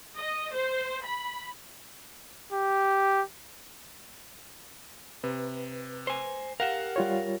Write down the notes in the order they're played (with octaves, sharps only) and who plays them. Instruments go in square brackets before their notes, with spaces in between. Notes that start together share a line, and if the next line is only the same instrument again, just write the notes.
[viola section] D#5
C5
B5
[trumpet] G4
[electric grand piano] C3 [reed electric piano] B4
[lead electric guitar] C5 G#5
[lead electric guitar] G4 A#4 [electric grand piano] F5 F#5 E7
[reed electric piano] G3 F4 C#5